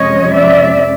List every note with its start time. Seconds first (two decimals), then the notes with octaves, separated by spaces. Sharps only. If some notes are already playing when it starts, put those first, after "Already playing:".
Already playing: F2 C3 F3 G#3 C#4 C#5 D#5
0.33 D5 E5